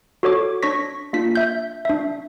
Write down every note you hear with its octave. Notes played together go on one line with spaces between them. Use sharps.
F#4 A4 C#5 D6
D4 C#5 C#6 A#6 B6
A#3 D4 F4 B6
E5 G6
D4 E5